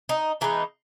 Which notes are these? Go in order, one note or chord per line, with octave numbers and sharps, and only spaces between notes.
D#4
E3 G#3 B3 D#4